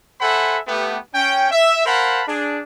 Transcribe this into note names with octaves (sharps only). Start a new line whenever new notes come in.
A4 C5 E5 F#5 G#5 B5
A3 B3 G4
C#4 G5
E5
A#4 C5 F5 F#5 A5 B5
D4 G#4